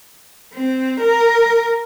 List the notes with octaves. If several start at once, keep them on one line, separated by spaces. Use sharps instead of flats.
C4
A#4